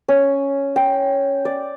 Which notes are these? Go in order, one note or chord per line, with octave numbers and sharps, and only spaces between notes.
C#4
G5
D5